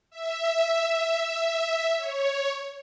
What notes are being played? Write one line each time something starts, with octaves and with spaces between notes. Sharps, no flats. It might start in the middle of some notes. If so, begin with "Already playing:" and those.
E5
C#5